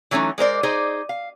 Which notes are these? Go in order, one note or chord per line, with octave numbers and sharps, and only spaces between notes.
E3 F#3 A3 C#4 D#4
G#3 A#4 C5 D5
D#4 G#4 C5 D5
F5